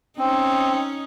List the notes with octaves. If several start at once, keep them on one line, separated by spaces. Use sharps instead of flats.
C4 C#4 D#4